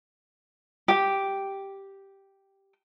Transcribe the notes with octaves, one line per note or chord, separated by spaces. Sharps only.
G4 G5